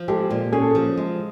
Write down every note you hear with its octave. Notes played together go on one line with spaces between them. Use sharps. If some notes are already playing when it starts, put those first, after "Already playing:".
Already playing: F3
G#3 G4 A4
A#2
C#4 G#4
A4
F3 G#4
G#3